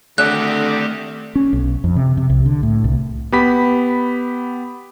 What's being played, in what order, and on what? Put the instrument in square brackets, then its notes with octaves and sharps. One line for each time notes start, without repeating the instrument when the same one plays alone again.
[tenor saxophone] D3 [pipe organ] D#3 C4 G4 [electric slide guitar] A3 D5 [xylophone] F#6
[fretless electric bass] C#4
B1
F2
C3
C3
C2
D3
A2
C2
[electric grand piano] B3 G4 B5 B6